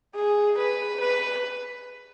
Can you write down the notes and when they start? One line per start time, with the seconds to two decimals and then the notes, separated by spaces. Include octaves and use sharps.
0.15 G#4
0.59 B4
1.01 B4